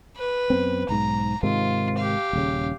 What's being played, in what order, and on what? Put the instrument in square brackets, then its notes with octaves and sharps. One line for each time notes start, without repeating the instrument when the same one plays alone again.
[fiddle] B4
[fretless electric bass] F#2 B3 C4
[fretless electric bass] B1 G#2 [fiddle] A#5
[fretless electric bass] G#2 C3 D#3 [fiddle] F4
[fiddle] G4 F5
[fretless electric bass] D#1 C#3